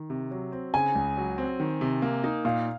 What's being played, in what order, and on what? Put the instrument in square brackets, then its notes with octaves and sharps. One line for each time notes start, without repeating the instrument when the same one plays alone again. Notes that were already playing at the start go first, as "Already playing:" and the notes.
Already playing: [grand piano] D#3
C3
F#3
C4
[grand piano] C#3 [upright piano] G#5
[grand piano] C#2
F#3
C4
D#3
C3
A#3
D#4
[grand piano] A#2 [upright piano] F5